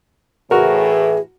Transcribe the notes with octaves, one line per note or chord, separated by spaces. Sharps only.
A2 E3 F#4 G#4 A#4